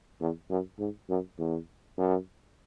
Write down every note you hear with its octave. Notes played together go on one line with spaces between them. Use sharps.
E2
F#2
G#2
F#2
E2
F#2